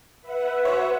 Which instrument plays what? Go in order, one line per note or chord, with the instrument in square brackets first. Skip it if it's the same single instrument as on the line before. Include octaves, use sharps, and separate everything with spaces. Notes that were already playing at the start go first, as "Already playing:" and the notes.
[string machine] B4 E5 F#5
[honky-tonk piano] F#4 C5 C#5